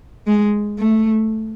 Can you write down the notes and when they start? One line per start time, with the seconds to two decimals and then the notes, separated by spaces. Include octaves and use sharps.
0.27 G#3
0.79 A3